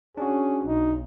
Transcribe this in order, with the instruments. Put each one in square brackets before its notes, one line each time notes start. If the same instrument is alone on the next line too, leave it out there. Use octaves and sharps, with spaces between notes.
[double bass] C#4 [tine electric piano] D4 F#4 [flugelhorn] G#4
[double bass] B1 [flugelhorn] D#4